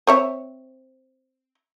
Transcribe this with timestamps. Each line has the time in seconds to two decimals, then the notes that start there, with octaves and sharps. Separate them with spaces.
0.07 C4 C#5 E5